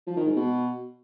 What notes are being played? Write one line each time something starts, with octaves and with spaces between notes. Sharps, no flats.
F3
D#3
G#2
B2